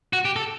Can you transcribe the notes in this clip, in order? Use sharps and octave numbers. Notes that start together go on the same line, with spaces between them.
F#4
G4
A4